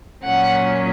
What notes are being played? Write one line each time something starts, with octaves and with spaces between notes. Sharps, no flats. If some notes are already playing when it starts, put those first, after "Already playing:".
A#2 F#3 C#4 F#5